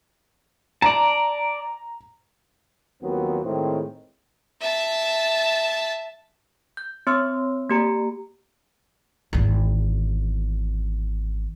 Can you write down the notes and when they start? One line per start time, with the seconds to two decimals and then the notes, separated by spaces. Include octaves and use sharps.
0.82 D5 A5 A#5
3.03 D#2 D#3 F3 F#3 B3 C4
3.44 A2 D#3 G#3 C4
4.61 E5 A5
6.77 G6
7.07 C4 C#5 C6 E6
7.69 A#3 G4 A#5
9.33 G#1 E2